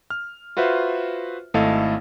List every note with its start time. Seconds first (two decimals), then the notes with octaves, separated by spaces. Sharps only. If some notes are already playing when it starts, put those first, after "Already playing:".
0.10 F6
0.57 F4 F#4 B4 C5 E5
1.54 G#1 A3 E4 A4 D#5 F5